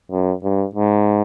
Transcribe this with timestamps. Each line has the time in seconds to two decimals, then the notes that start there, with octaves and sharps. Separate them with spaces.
0.12 F#2
0.43 G2
0.75 G#2